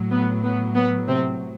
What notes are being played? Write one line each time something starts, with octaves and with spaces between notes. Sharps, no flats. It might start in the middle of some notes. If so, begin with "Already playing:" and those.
Already playing: A2 F#3
B3
B3
B3
C3 C4